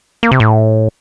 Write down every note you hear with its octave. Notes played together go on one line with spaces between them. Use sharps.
A#3
C3
A2